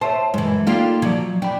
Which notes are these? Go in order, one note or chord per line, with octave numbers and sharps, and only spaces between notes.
C5 C#5 E5 A5
F#2 E3 G#3
A#3 D4 D#4 F4 G4 A4
F3 F#3 D5
D4 G5 B5